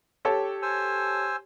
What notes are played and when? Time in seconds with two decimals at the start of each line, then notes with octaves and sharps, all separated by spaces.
0.25 G4 A4 C#5
0.62 C5 G#5 E6